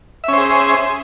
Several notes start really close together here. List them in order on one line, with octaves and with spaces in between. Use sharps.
E5 C#4 C5 G#4